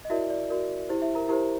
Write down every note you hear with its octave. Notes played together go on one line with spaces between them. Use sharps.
D#5
E4 F#4 A#4 D5 E5
D5
F#4 A#4 D5
E4 G4 C5
E4 E5
A#4 A#5
E4 G4 A#4 C5 A#5